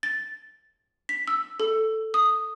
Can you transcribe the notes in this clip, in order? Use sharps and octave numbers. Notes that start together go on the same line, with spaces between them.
A6
B6
E6
A4
D#6